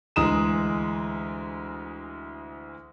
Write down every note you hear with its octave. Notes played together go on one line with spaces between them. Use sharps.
D2 E3 G#3 A#5 D#6 E7